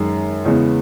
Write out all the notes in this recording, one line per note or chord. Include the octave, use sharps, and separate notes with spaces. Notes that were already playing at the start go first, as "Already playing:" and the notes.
Already playing: F#2 D#3 G#3
E2 C#3 E3 G#3 B3